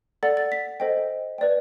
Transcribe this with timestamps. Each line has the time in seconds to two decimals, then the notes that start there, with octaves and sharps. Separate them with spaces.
0.23 A4 D5 F#5 A6
0.37 A6
0.52 B6
0.80 A4 C5 D#5 G5
1.38 B4 D5 G5